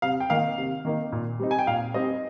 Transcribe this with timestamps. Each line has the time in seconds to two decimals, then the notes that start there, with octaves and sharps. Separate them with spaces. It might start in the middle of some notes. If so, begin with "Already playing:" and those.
0.02 C3 F5
0.20 G5
0.30 D#3 A#3 D#4 F5
0.58 C3
0.85 D#3 A#3 D#4
1.12 A#2
1.39 G3 C4 D#4
1.51 G#5
1.59 G5
1.67 A#2 F5
1.94 G3 C4 D#4 D#5